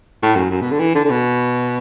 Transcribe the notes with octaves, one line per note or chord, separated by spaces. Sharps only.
A2
F#2
F#2
B2
D3
E3
D3
D3
B2